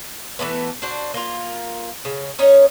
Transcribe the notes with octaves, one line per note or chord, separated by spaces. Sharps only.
E3 G#3 A3 B3
D4 F#4 C5
A#3 F4
C#3
C#4 D#4 C#5 D#5